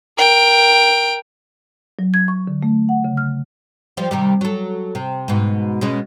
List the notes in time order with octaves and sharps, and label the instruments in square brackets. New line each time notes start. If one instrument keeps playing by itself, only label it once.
[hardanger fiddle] A#4 G5
[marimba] F#3
G#6
C#6
D3
A3
F#5
C#3
F6
[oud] F3 G3
C3 D#3 G3
F#3 A4
C3
G#2 B2
B2 G#3 C#4